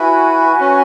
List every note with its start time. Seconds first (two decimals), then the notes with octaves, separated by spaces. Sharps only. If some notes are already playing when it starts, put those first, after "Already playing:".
Already playing: E4 F#4 B4 G#5
0.60 C#4